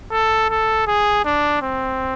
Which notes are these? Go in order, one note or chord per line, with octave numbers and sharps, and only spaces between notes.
A4
A4
G#4
D4
C4